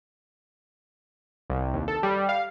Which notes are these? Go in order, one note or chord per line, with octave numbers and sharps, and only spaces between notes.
C2
D#2
A4
G3
F5